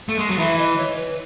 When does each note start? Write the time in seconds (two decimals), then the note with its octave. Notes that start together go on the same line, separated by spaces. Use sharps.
0.09 A3
0.19 G#3
0.29 F#3
0.38 E3 E5
0.58 D#5
0.77 C#5
0.96 B4